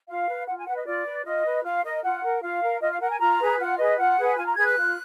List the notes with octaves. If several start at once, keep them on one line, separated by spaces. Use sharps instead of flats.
F4 F5
B4
F4 F#5
G#5
B4 F#5
D#5
F4 D5
B4
F4 D#5
B4
F4 F5
A#4 D#5
F4 F#5
A#4
F4 F5
A#4
F4 D#5
F5
A#4 F#5
G#5
F4 A#5
G#4 B4
F4 F#5
G#4 B4 D#5
F4 F#5
G#4 B4
F4 G#5
A#5
G#4 B4 G#6
F#6
F4